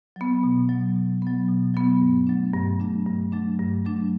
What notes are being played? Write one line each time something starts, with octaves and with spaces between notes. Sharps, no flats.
F#3 B3
B2
F#3 B3
B2
F#3 B3
B2
F#3 B3
G2
F#3 A3 D4
G2
F#3 A3 D4
G2
F#3 A3 D4
G2
F#3 A3 D4